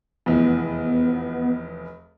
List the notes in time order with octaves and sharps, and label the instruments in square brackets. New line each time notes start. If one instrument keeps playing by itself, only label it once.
[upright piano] F1 E2 [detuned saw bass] B3